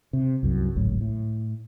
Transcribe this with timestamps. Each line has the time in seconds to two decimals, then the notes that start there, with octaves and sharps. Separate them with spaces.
0.13 C3
0.43 C2 F#2
0.76 G#1 C#2 A2 F#3
1.01 A2